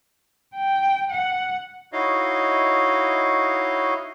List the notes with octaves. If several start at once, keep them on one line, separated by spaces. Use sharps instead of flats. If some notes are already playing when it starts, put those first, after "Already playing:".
G5
F#5
D#4 E4 F#4 C#5 D#5 F5